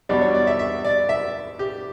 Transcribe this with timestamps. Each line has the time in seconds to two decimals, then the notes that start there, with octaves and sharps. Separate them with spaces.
0.09 E2 B2 G3 D4 D5
0.21 C#5
0.35 D5
0.47 E5
0.59 E5
0.85 D5
1.09 E5
1.59 G4